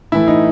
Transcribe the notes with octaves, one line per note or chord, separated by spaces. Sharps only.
A2 E3 A3 E4
D#4